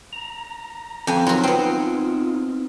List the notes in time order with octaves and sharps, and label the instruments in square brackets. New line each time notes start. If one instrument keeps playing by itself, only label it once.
[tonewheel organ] A#5
[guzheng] F2 G#5
[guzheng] F#3 A#4 [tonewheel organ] D#4 F4
[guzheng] B3 C4